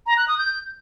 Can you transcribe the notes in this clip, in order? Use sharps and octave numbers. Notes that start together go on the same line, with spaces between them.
A#5
F#6
D#6
G6